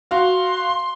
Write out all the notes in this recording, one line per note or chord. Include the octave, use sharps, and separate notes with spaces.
F#4 F5 C6